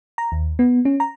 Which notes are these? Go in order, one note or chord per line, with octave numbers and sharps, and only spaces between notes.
A#5
D#2
B3
C#4
A#5